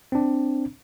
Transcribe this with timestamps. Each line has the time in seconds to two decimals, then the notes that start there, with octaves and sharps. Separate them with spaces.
0.12 C4 D4